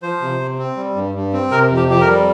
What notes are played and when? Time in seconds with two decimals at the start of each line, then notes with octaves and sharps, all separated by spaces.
0.02 F3 C5
0.21 C3
0.40 C3
0.58 C4
0.76 G3
0.95 G2
1.14 G2
1.33 C4
1.51 C3 A#4
1.70 F2
1.77 G4
1.89 F2 G4
2.01 A#4
2.07 G3